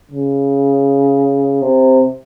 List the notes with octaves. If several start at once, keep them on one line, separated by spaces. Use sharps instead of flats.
C#3
C3